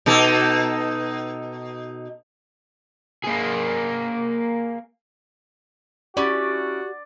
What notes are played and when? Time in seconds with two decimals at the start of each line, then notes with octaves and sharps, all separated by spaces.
0.06 B2 D#4 A4
3.25 A#3 G#4
6.17 C#4 E4 F#4 G4 D5